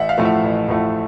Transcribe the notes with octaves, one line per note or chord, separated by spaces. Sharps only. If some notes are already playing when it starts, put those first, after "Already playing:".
Already playing: A1 E5 F#5
F5
A2 F3 A3
E5
A1
A2 F3 A3